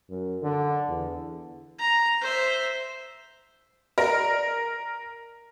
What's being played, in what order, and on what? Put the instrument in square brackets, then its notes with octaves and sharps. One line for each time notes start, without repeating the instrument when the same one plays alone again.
[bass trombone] F#2
D3
E2
[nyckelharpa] A#5
C5 E5
[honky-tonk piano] A#4 [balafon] D5